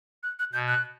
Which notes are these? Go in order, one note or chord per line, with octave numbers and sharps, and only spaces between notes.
F#6
F#6
B2 G6
F#6